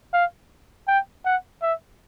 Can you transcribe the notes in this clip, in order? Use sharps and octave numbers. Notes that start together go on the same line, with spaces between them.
F5
G5
F#5
E5